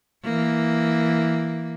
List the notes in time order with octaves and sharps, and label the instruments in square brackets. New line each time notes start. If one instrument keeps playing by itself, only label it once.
[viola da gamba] E3 A#3